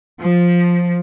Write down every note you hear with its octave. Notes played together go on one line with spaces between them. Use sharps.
F3